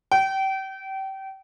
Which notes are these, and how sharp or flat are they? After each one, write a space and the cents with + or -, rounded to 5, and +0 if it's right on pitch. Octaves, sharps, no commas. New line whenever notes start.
G5 -30